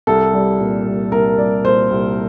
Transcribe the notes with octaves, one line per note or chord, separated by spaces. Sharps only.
C2 A4
G3
A#2
C2
C2 A#4
G3 D5
A#2 C5
C2